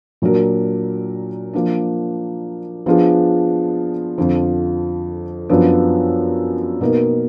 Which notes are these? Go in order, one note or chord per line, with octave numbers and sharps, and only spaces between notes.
A#2 F#3 D4 F#4 A#4
F3 A#3 D4
F3 B3 D4 F4 G#4
F2 D3 F3
F#2 F3 B3 D4
B2 A#3 D#4 A#4